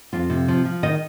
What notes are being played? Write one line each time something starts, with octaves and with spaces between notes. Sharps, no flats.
F2 F4
C3
F3
F3
D#3 D#5